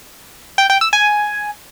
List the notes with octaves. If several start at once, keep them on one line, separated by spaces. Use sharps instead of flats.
G5
G5
E6
G#5